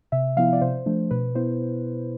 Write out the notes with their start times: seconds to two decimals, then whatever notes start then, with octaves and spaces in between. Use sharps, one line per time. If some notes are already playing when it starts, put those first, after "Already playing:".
0.12 C3 E5
0.37 F3 B3 E4 F5
0.53 D5
0.61 C3 C5
0.86 F3 A3 D4
1.11 B2 B4
1.35 B3 E4 C5